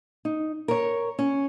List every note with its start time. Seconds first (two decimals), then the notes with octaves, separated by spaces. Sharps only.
0.25 D#4
0.68 A#4 C#5
1.19 C#4